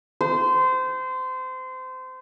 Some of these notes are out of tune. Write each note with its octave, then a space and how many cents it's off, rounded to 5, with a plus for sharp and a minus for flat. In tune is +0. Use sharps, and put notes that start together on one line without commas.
C5 -25